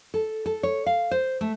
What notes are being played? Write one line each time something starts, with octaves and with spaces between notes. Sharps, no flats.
A4
A4
C#5
F5
C5
A3